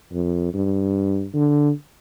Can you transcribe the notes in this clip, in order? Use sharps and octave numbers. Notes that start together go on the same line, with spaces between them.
F2
G2
D3